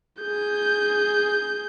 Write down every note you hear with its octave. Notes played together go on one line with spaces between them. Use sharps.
G#4 G6